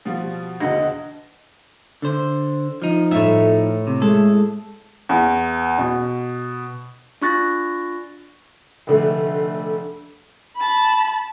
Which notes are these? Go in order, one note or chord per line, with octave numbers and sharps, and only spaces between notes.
B2 F3 G3
E1 D3 D#5 F#5
D3 C5
F3 D#4
A2 E5
C3
G#3 A4
E2
B2
D4 F4 C#6 F#6 A6 A#6
F1 D3 A3
A5 B5